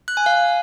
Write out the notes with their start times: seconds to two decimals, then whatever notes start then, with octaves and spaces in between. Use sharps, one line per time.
0.08 F#6
0.17 G#5
0.26 F5